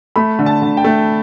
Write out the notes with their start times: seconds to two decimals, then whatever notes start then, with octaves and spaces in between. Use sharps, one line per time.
0.16 A3 B5
0.39 D3
0.46 A5
0.62 D3
0.77 G5
0.84 A3